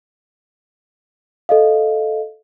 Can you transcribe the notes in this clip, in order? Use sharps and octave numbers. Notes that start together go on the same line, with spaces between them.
A4 D#5 F5